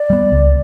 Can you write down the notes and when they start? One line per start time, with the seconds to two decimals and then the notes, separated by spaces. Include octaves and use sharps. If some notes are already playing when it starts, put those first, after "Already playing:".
Already playing: D5
0.10 G3 B3
0.32 C#2